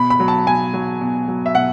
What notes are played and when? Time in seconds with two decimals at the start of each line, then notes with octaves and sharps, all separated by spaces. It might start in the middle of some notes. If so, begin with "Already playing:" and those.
Already playing: B2 B5
0.10 B5
0.20 F#3
0.28 A5
0.46 B2 G#5
0.74 F#3
1.01 B2
1.28 F#3
1.46 E5
1.55 B2 F#5